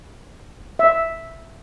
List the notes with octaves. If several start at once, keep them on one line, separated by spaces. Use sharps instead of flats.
E5